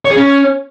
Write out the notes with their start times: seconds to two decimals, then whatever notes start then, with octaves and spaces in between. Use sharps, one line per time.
0.05 C#5
0.11 G#4
0.16 C#4